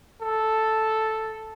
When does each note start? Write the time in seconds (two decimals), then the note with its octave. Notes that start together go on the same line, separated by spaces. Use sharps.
0.22 A4